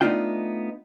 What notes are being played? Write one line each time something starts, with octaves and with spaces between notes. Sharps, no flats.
A3 B3 D4 D#4 F4 G5